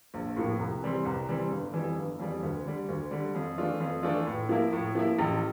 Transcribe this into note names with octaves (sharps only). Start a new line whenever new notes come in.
A#1
A2 F3 A#3
C2
C3 E3 G3 C4
C2
C3 E3 G3 C4
G1
F2 E3 G3
G1
F2 E3 G3
D2
D3 G3
D2
D3 G3
F2
E3 A3 D4 F4
F2
E3 A3 D4 F4
A2
F3 A#3 E4
A2
F3 A#3 E4
A1